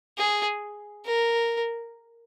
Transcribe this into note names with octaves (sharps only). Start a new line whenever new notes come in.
G#4
A#4